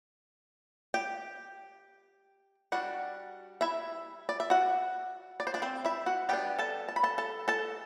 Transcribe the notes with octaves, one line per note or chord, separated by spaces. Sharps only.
G4 G5
G3 D4 F#4 F#5
E4 E5
D5
E5
F#4 F#5
D5
C5
D4 D5
C4 C5
E4 E5
F#4 F#5
G3 B3 D4 G4 G5
A4 A5
A5
B5
A4 A5
A4 A5
A4 A5